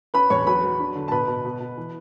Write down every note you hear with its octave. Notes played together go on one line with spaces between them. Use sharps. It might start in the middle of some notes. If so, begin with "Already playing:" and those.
C#4 B4 B5
E2 C#5 C#6
F#3 B4 B5
F#3
D4
D3
A5
B2 B4 B5
B2
B2
B2
E3